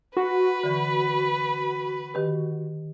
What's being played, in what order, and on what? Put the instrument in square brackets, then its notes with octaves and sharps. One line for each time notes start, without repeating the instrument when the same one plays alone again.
[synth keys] F#4 [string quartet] B4
[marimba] D3 E3
D#3 G4 B4